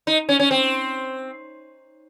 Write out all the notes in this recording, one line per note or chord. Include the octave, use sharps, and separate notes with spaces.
D#4
C#4
C#4
C4